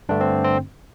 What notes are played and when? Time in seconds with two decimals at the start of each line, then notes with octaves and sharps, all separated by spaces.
0.09 G2 D3 A3 D4
0.21 C4
0.44 C4